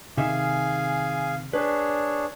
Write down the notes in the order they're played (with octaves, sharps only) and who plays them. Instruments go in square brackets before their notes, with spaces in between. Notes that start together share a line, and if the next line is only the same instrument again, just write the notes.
[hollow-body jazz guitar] C3 D#3 E5 [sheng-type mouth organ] G#4 F5 G#5
[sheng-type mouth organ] D4 G#4 C#5 [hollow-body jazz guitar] B4